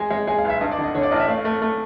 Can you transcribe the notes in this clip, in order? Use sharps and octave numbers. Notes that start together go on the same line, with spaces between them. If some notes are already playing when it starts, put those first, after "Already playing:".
Already playing: G#3 G#5
G#3
G#3 G#5
F5
B1
E5
G2 D#5
D5
D3
D#5
D3 C#5
D5
A1 D#5
E5
A3 F5
A3
A3